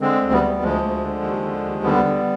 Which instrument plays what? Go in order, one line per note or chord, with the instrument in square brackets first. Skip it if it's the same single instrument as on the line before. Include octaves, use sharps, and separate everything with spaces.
[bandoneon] D3 G#3 C4
D2
G3 B3
D2
D2 F3 G#3
D2
D3
D#2
D3
D#2
D3 G3 B3
D3